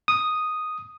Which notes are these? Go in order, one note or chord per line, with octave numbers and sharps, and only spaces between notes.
D#6